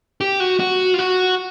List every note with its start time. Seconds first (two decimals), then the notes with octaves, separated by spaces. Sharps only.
0.21 G4
0.40 F#4
0.60 F#4
0.94 F4
0.98 F#4